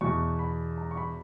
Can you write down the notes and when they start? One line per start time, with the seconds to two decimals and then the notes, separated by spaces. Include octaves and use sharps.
0.01 E2 B2 C#6
0.39 B5
0.78 A#5
0.91 C#6
0.97 B5